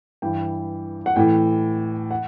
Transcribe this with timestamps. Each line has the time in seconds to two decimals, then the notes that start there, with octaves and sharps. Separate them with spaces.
0.22 G2 E3 G5
1.06 F#5
1.16 A2 E3 G5
2.11 F#5